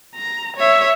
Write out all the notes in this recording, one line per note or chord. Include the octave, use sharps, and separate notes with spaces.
A#5
C#5 E5